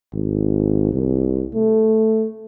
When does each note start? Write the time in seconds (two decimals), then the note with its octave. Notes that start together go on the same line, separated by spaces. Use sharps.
0.13 G#1
0.93 C2
1.54 A3